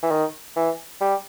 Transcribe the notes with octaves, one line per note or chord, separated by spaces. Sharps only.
E3
D#3
E3
G3